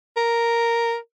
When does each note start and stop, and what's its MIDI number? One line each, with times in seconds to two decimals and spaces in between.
0.17 0.97 70